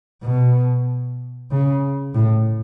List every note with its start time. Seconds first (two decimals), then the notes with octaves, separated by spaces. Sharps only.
0.23 B2
1.51 C#3
2.15 A2